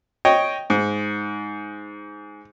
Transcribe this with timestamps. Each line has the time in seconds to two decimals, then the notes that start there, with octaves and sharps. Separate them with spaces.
0.25 C#5 D#5 G5
0.70 G#2